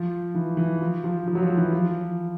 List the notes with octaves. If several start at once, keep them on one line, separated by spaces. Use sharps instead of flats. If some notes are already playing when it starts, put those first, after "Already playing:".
Already playing: F3
E3
E3
F3
F3
F3
F#3
F3
E3
F3